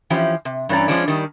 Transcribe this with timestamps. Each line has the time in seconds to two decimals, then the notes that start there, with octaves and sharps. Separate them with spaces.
0.10 E3 F3 C#4 G4
0.45 C3
0.69 G2 E3 C#4 D5 A#5
0.88 F3 G#3 C#4 D4
1.08 D#3 G3